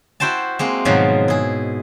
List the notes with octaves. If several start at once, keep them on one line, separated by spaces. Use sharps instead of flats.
E4 F#4 C5 G5 A5
G#3 A#3 C4
G#2 B2 D#3 F3 F#3
E4 G#4